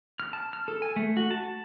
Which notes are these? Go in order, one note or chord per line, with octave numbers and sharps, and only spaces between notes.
F6
A5
F6
A4
G#5
A3
F#4
A5